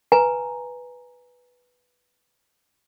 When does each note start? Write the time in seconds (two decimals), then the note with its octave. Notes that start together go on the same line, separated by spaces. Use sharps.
0.12 B4 G#5 A#5